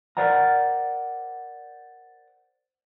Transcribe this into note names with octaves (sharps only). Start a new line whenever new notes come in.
A#4 C5 D5 F#5 A#5